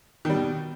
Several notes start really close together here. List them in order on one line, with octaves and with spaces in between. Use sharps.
D#3 G3 B2